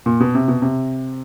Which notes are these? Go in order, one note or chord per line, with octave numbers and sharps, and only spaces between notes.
A#2
B2
C3
B2
C3